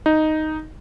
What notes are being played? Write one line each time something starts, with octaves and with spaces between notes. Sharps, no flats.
D#4